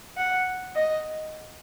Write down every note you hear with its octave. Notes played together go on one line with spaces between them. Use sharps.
F#5
D#5